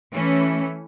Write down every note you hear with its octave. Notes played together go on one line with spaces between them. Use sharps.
E3 A3 C#4